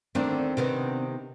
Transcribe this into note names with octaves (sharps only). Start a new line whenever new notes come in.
D2 D3 D#3 C4 D4 D5
C3 D#3 B3